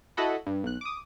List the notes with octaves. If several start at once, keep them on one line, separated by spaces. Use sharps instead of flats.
E4 F#4 A4 D#5 F#5 B5
G2
B1 F#6
D6 D#6